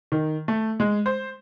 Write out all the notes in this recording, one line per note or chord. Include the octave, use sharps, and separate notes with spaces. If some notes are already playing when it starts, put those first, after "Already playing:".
D#3
A3
G#3
C5